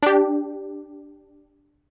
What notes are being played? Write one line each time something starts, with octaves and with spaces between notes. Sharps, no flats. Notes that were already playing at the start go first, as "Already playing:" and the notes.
D4 G4